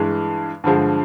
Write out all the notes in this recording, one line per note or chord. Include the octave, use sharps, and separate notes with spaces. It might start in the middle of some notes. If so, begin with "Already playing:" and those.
Already playing: G2 E3 G#3
G2 D3 F3 G#3